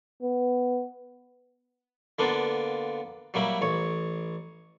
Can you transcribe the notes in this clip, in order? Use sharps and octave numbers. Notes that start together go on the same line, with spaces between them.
B3
D3 A#3 B3 D4 F4
F#3 G3 A#3 E4
A1 C#5